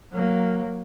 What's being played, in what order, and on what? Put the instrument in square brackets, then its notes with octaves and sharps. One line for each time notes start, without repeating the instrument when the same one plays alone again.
[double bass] F#3 A#3